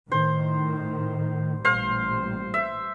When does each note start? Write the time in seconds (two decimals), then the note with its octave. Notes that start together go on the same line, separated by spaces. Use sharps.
0.11 A2 D#3 C5
1.65 A1 A#2 G3 C5 F5
2.54 E5